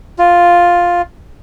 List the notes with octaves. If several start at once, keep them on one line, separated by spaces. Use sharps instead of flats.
F4